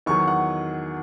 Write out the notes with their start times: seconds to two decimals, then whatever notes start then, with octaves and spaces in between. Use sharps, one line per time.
0.06 E2 D#3 F#3 C#6
0.28 F#5